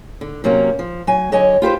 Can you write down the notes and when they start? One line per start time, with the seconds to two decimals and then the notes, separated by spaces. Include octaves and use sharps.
0.21 D3
0.44 C3 F#3 A#3 C#4
0.79 F3
1.07 F#3 G#5
1.32 D3 F#3 C#5 D#5 G#5
1.62 F4 G4 B4 C5